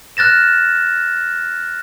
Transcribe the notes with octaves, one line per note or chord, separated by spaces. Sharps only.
F6 F#6 A6 A#6 E7